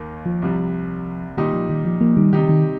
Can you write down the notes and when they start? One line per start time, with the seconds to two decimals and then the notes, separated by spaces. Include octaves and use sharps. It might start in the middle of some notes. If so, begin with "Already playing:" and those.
Already playing: D#2 D#3 A#3
0.26 F3
0.42 C2 C3 G3
1.37 A#2 D#3 G3 D#4 G4
1.53 F3
1.69 D#3
1.85 F3
2.01 F3 A#3
2.17 D#3 G3
2.33 C3 D#3 G3 D#4 G4
2.49 D#3